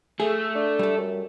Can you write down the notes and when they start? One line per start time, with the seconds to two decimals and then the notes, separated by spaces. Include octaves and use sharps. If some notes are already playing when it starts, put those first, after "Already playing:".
0.20 A3 G#4
0.55 D4
0.79 G3 A4
0.97 F#2